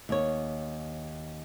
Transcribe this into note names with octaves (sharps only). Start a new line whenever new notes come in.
D#2 C#5